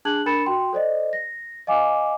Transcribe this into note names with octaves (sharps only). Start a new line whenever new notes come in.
D4 G#4 A5 F#6 G#6 F#7
D4 A#4 B5 A6 C#7 E7
F#4 G5 C6
A4 C5 D5 D#5
A#6
D#5 F5 G#5 D6